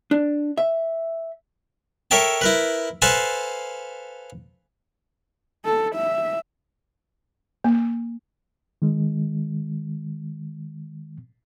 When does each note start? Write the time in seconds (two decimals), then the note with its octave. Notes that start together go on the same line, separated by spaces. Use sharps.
0.11 D4
0.58 E5
2.11 A4 A#4 C#5 E5 G5 A5
2.41 E4 A#4 B4
3.02 A4 B4 C5 F5 G#5 A5
5.65 A4
5.96 E5
7.64 A#3
8.82 D#3 G#3